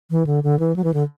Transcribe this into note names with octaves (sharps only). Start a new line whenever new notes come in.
E3
D3
D3
E3
F#3
E3
D3